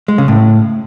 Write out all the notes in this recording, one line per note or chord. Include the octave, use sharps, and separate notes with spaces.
G#3
C#3
A2